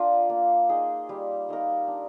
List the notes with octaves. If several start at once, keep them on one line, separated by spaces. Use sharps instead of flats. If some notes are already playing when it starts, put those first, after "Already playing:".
Already playing: D4 F4 A#4
A#3
D#4 G#4
G3
A#3 D#4 A#4
D4